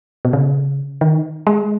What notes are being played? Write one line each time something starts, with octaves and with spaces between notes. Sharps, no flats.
B2
C#3
D#3
G#3